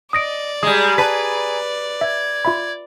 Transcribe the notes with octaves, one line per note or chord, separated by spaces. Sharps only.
D5 D#5 D#6 A#6 D7
G3 G#3 G#4 G#5 A#5 D#6
B4 A5 B6
E5 G#6
F4 E5 B5